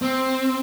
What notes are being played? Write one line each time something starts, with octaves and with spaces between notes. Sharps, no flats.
C4